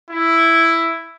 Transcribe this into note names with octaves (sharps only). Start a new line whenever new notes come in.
E4